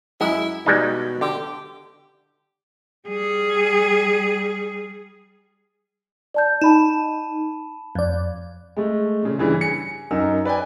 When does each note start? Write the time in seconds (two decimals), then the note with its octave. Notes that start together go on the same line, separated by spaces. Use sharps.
0.21 F#2 G#3 E4
0.66 B2 G3 G#3 D#4
1.21 D3 G4
3.08 G3 G#4
6.34 D5 A5 G6
6.62 D#4 A5 B5 E7
7.95 F2 D5
8.77 G#3 A3
9.22 A#2 C#3
9.38 G2 C#3 E3
9.61 G#5 C#7
10.11 F#2 D#4 A#4 E6
10.45 B4 D5 G5 G#5